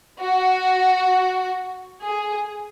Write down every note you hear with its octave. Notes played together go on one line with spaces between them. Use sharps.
F#4
G#4